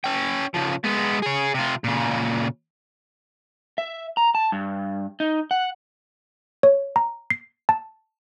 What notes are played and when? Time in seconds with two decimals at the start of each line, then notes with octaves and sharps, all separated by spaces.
0.04 C#4 G5
0.54 C#3 F3
0.84 G#3 B3
1.22 G#4 C#5
1.54 C3 F4
1.84 A#2 C#3
3.78 E5
4.17 A#5
4.35 A5
4.52 G2
5.20 D#4
5.51 F#5
6.63 C#5
6.96 A#5
7.30 C7
7.69 A5